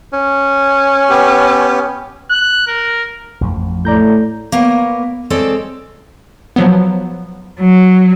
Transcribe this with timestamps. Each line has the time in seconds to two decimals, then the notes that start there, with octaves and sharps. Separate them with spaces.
0.13 C#4
1.10 B3 G4
2.30 F#6
2.68 A#4
3.41 A1 F2 F3
3.85 A2 D5 A#5 G6
4.52 A#3 B3 A#4 C#5
5.30 G#3 C4 A4 C#5 D5
6.56 F3 F#3 B3
7.60 F#3